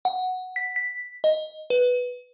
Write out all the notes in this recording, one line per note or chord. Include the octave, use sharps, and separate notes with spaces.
F#5
B6
B6
D#5
B4